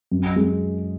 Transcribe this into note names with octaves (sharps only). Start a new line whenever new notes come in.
F#2
G#3